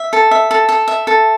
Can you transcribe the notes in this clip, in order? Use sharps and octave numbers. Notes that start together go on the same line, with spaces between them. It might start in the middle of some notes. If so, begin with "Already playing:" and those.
Already playing: E5
A4
E5
A4
A4
E5
A4